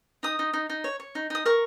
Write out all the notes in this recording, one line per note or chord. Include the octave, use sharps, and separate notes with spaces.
D#4 D#6
D#4
D#4
D#4
C#5
C#5
D#4
D#4 D#6
A#4 C#6